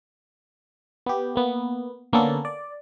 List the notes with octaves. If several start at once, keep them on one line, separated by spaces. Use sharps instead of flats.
B3 G4
A#3 B3
D3 A#3 B3 C#4 D4 A4
D5